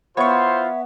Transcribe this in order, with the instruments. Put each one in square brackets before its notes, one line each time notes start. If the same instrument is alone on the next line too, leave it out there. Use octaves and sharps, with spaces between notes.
[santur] B3 [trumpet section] E4 F4 C5 [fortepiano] C#5 C#6 [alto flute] E5